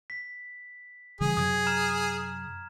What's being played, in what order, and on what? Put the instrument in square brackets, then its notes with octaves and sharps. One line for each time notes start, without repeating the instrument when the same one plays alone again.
[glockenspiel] B6
[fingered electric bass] C#3 E3 G3 [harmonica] G#4
[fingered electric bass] F#2 C3 F#3 [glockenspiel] D#6 G#6
[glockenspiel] A#5 F6 E7